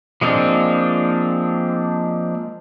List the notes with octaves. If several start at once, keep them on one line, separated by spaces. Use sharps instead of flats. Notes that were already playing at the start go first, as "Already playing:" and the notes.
F3 G#3 A#3 C4 D4